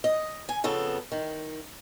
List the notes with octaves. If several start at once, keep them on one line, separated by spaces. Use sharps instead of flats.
D#5
G#5
F2 C#3 B3 A4
D#3